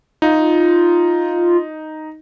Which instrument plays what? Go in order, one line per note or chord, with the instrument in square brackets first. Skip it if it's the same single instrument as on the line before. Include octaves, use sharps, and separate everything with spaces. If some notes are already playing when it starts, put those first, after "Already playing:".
[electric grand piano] D#4 [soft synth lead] F4